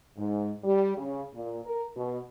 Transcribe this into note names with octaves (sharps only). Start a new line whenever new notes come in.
G#2
G3
C#3
A#2
A#4
B2